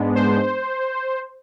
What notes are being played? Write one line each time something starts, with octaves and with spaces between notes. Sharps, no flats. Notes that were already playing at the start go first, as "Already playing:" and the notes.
Already playing: G#2 G#3 B3 D4
C5